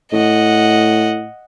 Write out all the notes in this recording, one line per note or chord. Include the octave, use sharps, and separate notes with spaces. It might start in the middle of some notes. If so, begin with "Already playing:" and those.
A2 D#5 F#5